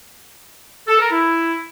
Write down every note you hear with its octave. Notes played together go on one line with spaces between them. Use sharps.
A4
A#4
E4